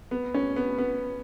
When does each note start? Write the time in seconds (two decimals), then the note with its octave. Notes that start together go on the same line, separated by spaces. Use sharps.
0.11 B3
0.34 C#4
0.56 B3
0.78 B3